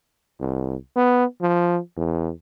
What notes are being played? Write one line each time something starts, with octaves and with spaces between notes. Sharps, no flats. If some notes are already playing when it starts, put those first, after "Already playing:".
C2
B3
F3
E2